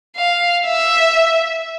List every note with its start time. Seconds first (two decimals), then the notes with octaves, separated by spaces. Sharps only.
0.16 F5
0.66 E5